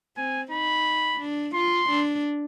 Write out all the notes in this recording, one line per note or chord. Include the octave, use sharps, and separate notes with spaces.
C4 G#5
D#4 B5
D4
F4 C6
D4